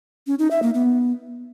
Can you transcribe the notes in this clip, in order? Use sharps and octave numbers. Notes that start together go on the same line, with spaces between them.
C#4
D#4
E5
A#3
B3